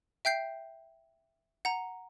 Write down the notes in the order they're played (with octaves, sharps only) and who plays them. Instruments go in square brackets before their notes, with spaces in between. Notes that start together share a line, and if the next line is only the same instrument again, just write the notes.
[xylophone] E5 G5 G6 C7
F#5 A#5